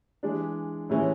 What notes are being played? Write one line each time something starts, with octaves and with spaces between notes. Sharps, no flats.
E3 G#3 D4
A2 E3 G#3 C#4 E4